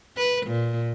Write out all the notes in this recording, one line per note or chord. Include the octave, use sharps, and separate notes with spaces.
B4
A#2